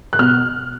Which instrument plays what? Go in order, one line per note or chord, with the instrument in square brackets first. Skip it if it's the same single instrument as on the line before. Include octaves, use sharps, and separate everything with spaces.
[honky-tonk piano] F#6
B2 F6